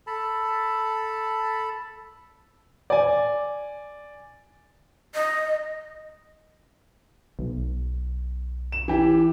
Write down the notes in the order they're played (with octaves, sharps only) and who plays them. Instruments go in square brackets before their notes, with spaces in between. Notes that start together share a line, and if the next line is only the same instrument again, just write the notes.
[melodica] A4 A5 B5
[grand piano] D5 G#5
[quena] D#5
[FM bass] B1
[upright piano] E7
E3 G4